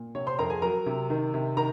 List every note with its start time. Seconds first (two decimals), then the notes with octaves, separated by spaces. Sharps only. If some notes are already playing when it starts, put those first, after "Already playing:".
Already playing: A#2
0.15 C3 C#5
0.27 C5 C6
0.39 F2 A#4 A#5
0.50 G#4 G#5
0.62 F#3 A#4 A#5
0.86 C3
1.10 D#3
1.34 C3
1.57 D#3 A#4 A#5